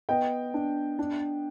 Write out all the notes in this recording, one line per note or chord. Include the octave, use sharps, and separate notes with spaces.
B3 D#5 G5
D4
D4